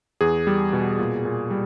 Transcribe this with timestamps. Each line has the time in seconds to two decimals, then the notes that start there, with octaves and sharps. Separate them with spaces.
0.21 E2 G#4
0.47 G3
0.73 B2
0.99 A#2
1.25 A#2
1.51 G3